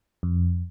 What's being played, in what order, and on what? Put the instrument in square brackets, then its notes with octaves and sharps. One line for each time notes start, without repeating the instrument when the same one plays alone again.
[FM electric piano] F2